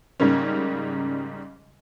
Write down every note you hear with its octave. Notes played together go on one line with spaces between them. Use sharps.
G#2 C#3 G3 A#3 C#4